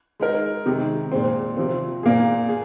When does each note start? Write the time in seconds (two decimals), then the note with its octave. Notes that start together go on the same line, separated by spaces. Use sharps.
0.20 G#3 D#4 A#4
0.66 C3 D#3 G#3
1.12 A#2 G#3 C4
1.57 C3 F3 C4
2.03 A#2 A#3 G#4
2.49 G#4